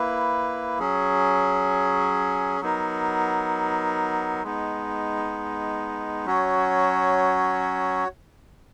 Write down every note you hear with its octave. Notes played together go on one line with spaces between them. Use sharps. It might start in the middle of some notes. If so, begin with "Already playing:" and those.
Already playing: A#3 E4 B4
F#3 C#4 G#4
F#3 B3 D#4 A#4
G#3 B3 D#4
F#3 C#4 F#4 C#5